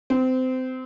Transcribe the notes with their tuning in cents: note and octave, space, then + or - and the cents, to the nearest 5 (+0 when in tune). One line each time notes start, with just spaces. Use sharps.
C4 -25